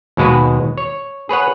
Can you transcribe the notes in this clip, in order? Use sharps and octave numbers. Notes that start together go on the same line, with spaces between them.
D#2 B2 G#3 F#4 B4
C#5
G#4 B4 C#5 F#5